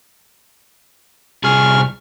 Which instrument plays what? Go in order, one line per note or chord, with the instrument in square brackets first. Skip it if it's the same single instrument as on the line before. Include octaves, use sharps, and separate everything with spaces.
[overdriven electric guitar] C2 G#4 [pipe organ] C#6 F6